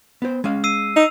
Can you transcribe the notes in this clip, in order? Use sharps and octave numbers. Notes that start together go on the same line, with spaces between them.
B3 C5
G#3 C#4 F5
E6 C7 D#7
D#4 E6 F7